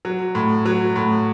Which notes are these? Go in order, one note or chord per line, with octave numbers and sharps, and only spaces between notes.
F#3
A2
F#3
A2